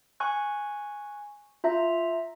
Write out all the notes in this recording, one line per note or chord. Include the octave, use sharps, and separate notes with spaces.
G#5 C#6 F#6
F4 E5 A#5